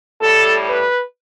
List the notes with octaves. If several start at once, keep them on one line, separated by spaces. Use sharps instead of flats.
A2 G3 A4
B4